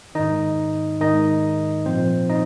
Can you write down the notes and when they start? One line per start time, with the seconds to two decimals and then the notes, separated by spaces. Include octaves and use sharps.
0.15 G#2 D#3 D#4 D#5
1.01 G#2 D#3 D#4 D#5
1.86 A#2 F3 C4 C5
2.30 D#4 D#5